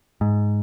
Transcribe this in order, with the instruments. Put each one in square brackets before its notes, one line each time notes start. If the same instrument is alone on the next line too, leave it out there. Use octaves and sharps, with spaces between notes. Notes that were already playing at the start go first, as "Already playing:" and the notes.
[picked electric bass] G#2